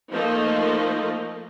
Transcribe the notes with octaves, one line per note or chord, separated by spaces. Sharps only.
F3 A3 A#3 D#4 D#5